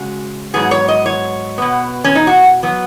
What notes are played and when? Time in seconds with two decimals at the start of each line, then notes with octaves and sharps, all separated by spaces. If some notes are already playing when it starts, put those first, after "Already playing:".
Already playing: C#3 G#3 F#4
0.54 G#2 F#3 B3 G#4
0.71 C#5
0.88 D#5
1.06 C#5
1.58 B2 B3
2.04 C#4
2.15 D#4
2.27 F#4
2.63 F#3 B3